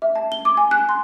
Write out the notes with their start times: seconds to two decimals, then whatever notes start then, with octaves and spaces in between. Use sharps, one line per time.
0.02 E5
0.16 A5
0.32 G7
0.45 D6
0.57 G#5
0.71 F#6
0.89 C6